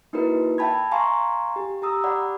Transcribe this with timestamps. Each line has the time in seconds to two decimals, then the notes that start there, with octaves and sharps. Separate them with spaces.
0.13 A#3 D#4 E4 F#4 A#4 B4
0.58 E5 G5 A5 B5 G#6
0.91 F5 G#5 A#5 C6 C#6
1.56 G4
1.82 G4 A#5 D#6 E6
2.04 G4 D5 F#5 B5